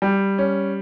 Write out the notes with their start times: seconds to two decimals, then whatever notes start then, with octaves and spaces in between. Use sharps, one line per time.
0.02 G3
0.38 C#4